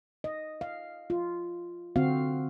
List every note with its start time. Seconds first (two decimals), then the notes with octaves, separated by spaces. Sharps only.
0.24 D#5
0.61 F5
1.10 F4
1.96 D3 C4 F#4 F5